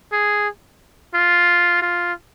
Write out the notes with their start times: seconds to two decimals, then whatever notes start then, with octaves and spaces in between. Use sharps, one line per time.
0.12 G#4
1.14 F4
1.82 F4